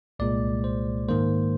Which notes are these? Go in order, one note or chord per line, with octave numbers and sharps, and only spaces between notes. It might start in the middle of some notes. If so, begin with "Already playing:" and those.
C2 A#2 G#3 D5
C5
G#2 D#3 A#3 C5